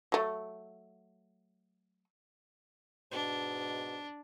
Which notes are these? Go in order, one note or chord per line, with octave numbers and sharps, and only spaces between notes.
F#3 A3
G#2 B2 D4